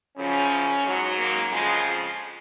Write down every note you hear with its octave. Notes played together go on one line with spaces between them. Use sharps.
F#2 C#3 F3 C#4
G#2 F#3
A#3
F2 C#3 F3 G#3